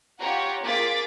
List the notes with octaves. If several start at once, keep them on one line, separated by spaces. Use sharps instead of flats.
F4 G4 C#5 F#5 A#5
A#3 F4 G#4 D6 A6 B6